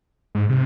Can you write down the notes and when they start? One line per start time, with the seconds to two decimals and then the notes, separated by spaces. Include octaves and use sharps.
0.35 G#2
0.49 C3